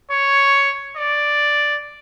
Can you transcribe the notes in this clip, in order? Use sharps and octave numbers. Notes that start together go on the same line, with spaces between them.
C#5
D5